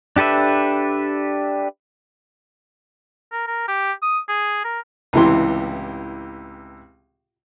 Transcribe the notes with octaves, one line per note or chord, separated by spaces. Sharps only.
D4 G4 A4 B4 E5
A#4
A#4
G4
D#6
G#4
A#4
C#2 A2 C3 E3 G4 C6